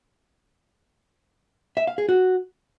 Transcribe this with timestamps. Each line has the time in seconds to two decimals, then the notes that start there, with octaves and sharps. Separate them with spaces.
1.77 E5
1.87 F5
1.98 G#4
2.09 F#4